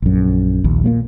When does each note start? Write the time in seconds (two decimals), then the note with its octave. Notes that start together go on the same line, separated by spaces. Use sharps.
0.02 A#1 F#2
0.64 A#1 D#2
0.84 A#2 F#3 A#3